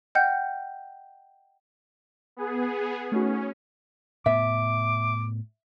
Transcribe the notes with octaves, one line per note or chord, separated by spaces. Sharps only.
D#5 F#5 G5 F6 G6 C#7
B3 G#4
A3 C#4 D#4 F#4
A2 B3 E5 D6